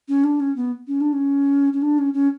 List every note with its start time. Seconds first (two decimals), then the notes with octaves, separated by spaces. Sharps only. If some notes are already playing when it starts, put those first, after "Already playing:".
0.08 C#4
0.24 D4
0.40 C#4
0.56 B3
0.87 C#4
1.00 D4
1.13 C#4
1.73 C#4
1.82 D4
1.98 C#4
2.14 C#4